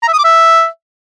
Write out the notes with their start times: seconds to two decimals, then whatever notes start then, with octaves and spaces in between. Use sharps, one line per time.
0.03 A#5
0.08 E5
0.13 D#6
0.19 D6
0.24 E5